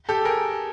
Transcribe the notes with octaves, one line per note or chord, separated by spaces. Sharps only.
G4 A4
G#4 A#4